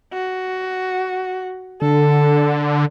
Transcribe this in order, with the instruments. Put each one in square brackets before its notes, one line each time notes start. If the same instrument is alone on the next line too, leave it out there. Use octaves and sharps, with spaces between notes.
[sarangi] F#4
[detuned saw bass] D3 [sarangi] A4